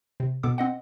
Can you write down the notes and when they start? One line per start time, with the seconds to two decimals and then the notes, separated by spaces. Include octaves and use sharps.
0.20 C3
0.43 B2 B3 A4 D6
0.58 C4 D#5 F#5